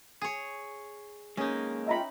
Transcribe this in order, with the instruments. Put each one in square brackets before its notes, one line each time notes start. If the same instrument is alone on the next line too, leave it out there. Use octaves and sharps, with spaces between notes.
[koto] G#4 C#5
[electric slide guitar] G#3 A#3 [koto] C#4 D#4
[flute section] F4 D#5 G5 [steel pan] E5 A#5 B5